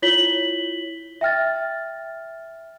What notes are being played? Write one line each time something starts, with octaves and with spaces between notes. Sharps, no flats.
E4 F4 C#5 B6 F#7 G7
E5 G5 F6 A6